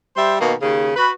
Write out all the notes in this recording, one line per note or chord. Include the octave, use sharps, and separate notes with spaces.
G3 C5 E5
B2 D#3 A#3
D#2 C#3
F#4 B4